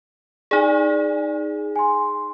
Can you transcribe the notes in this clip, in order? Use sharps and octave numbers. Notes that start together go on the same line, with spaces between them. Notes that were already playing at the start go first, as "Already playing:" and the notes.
D#4 G#4 D5 G#5
G#5 C6